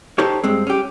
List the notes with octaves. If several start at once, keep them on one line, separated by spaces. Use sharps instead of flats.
D#4 G4 A4 C5 C#5
G2 G#3 C4
C#4 G4